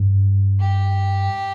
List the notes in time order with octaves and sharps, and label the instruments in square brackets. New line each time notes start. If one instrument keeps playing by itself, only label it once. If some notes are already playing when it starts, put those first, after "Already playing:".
Already playing: [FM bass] G2
[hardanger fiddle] G4